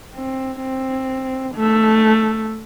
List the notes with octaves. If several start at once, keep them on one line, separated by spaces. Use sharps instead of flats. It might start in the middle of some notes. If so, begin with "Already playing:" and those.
C4
C4
A3